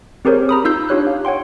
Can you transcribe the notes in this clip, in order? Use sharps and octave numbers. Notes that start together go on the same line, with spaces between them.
C4 G4 G#4 A#4 C5 C#5
A#5 B5 D#6
D#4 F4 E6 G6 C7
D4 F4 G4 C#5 F#6
F5
C#5 F#5 G5 C6